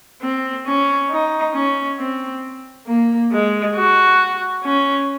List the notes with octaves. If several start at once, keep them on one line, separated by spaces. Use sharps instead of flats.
C4
C#4
D#4
C#4
C4
A#3
G#3
F#4
C#4